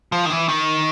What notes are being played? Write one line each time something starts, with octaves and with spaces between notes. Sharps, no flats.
F3
D#3
E3
D#3